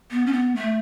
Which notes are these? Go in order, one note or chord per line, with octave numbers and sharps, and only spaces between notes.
B3
C#4
B3
A3